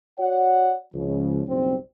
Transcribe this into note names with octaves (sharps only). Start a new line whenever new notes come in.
F#4 C#5 D5 F#5
C#2 C#3 F3
F#1 B1 G3 C4